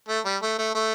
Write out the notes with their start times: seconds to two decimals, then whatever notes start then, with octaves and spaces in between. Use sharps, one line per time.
0.08 A3
0.25 G3
0.42 A3
0.58 A3
0.75 A3